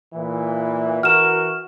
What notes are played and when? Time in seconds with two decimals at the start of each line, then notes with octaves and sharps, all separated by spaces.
0.13 A#2 E3
1.03 E3 F#4 A#4 F6 E7